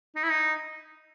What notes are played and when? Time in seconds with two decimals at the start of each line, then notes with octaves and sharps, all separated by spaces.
0.15 D#4
0.23 E4
0.30 D#4